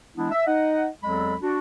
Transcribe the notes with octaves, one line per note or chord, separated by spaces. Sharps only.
E3 G#3 B3 D4 E4
E5
D#4 D#5 F#5
E2 F#3 G#3 C4 A4 B5
D4 F#4